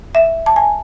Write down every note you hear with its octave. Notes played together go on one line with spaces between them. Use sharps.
E5
A5
G#5